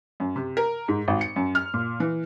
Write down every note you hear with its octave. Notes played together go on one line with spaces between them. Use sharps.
F#2
C3
A#4
G#2
G#1
C#7
F#2
F6
A#2
E3